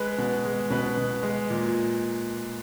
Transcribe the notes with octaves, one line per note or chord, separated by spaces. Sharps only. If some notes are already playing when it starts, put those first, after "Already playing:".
Already playing: G#3 B4
B2
G#3
B2 B4
B2
G#3
A#2